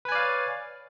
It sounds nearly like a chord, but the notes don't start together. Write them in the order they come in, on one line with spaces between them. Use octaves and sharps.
B4 G#5 D5 F5 C#5